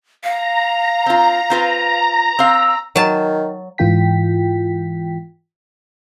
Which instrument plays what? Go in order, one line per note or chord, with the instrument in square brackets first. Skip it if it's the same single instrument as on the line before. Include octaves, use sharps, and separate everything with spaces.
[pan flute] F5 [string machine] A#5
[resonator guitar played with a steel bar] C4 F4
C4 F4 B4
[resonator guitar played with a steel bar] C4 F5 [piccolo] E6
[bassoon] D#3 [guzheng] F#3 A5
[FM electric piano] G#2 E3 F4 G5 B6